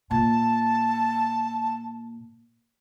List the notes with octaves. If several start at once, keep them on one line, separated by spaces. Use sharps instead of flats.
A#2 A5